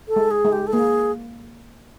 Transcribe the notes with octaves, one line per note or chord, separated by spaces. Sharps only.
A4
G#3
G#4
G#3
G4
A4
A#3 G#4